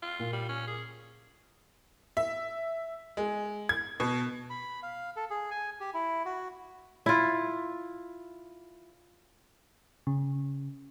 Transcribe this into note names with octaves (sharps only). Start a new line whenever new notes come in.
F4
A#2
G3
C#4
G#4
E5
G#3
G#6
B2
B5
F5
A4
G#4
G#5
G4
E4
F#4
E4 F4
C#3